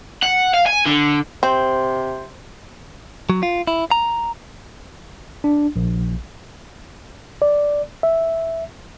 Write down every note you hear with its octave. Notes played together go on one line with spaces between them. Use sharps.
F#5
F5
G#5
D3
C3 C4 C5 C6
F#3
F4
E4
A#5
D4
A#1
D5
E5